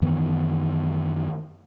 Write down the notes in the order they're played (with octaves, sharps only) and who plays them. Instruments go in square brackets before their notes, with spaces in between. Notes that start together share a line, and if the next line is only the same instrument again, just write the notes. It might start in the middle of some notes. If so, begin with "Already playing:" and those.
[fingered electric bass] F#2 D#3 E3 B3